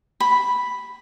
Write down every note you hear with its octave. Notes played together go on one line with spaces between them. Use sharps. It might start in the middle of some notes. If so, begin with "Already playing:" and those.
B5